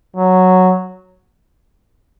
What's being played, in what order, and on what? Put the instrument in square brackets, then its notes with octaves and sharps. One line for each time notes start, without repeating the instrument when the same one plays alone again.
[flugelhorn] F#3